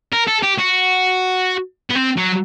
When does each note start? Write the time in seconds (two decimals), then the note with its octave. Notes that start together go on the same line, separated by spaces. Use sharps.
0.12 A#4
0.27 A4
0.43 G4
0.58 F#4
1.90 B3
1.95 C4
2.17 F#3